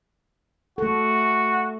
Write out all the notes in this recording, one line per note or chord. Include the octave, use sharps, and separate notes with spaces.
A3 F#4 A4